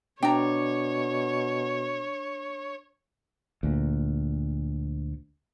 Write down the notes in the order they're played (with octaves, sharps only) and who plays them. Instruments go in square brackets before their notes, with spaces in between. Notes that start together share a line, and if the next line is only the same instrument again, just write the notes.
[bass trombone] B2 [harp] D4 [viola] C#5 [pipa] G5 A#5
[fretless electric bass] D2 A#2